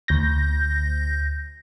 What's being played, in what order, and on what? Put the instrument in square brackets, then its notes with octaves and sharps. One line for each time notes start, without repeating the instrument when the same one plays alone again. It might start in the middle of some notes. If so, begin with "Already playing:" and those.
[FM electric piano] D2 G6 A#6